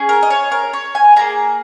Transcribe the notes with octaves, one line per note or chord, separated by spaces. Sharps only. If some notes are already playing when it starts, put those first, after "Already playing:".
Already playing: C#4 G#4
A#4
D#5
C#5
A#4
C#5
G#5
A#3 F4 G#4 A#5